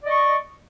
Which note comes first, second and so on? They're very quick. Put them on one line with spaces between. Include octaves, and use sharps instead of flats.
D5 D#5 C#6